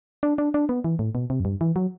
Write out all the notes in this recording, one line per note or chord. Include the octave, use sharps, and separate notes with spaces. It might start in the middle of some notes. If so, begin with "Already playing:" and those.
D4
D4
D4
B3
E3
A2
B2
C3
F#2
G2
E3
F#3